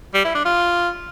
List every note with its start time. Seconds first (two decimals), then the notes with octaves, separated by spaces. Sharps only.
0.15 G3
0.25 E4
0.35 D4
0.45 F4